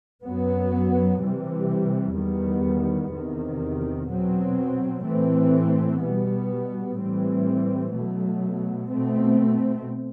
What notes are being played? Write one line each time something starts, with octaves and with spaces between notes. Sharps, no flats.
F#2 F#3 B3
C3 E3 G3
E2 D#3 G3 B3
E2 C3 D#3
B2 F#3 C4
A2 E3 A3 C4
B2 G3 B3
A2 E3 G3 C4
B2 F#3 A3
B2 A3 C4